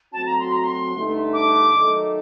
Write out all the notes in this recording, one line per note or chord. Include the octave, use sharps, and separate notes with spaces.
F#3 A3 C4 F#4 A5
A#5
C6
A#5
C6
G2 D3 A3 D#4
D6
D#3 F#3 A3 D#4 A4